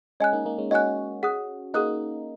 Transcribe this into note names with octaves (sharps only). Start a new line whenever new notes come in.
G#3 C#4 D#5 G#5 F#6
A#3 D#4
A#3 D#4
G#3 C#4
C#4 F#4 D#5 G#5 F#6
G#4 F#5 D#6 F#6
A#3 D#4 G#4 F#5 D#6 F#6